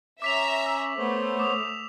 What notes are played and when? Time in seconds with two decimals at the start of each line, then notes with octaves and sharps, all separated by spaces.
0.22 C#4 E5 A#5 D6 B6 F7
0.66 E6
0.97 A3 B3 C5 C#5
1.39 D6 D#6 F7